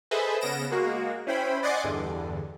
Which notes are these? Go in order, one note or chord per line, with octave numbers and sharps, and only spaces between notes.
G#4 A4 B4 C5 D#5 E5
C#3 B3 A#6 D7 E7
G#3 A#3 F#4
C#4 E4 C5 G5 B5
D5 D#5 F#5 G#5 C6 D6
E2 G2 D3